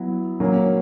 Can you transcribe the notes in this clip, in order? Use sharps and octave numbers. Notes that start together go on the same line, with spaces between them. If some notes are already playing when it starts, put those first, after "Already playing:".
Already playing: F#3 B3 E4
F#3 A#3 C#4